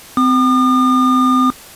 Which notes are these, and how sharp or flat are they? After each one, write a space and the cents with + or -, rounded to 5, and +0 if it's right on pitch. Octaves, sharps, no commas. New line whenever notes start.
C4 -30 D#6 -45